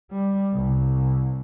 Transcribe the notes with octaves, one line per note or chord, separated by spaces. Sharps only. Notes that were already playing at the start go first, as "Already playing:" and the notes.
G3
C2